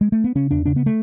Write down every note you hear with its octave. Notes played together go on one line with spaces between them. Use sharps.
G#3
A3
B3
C#3 C#4
E2 D4
C#3 D4
B3
A3